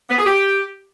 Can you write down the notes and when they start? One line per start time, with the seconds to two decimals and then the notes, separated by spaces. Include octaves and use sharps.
0.10 B3
0.18 G#4
0.26 G4